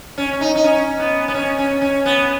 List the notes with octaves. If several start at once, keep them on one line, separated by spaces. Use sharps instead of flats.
C#4
C#4
D#4
D#4
C#4
B3
B3
C#4
C#4
C#4
B3